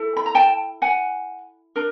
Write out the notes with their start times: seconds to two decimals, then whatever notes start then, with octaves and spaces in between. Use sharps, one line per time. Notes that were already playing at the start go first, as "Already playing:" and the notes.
Already playing: E4 A4
0.17 B5
0.26 A#5
0.35 G5 A5
0.82 F#5 G#5
1.76 D4 A#4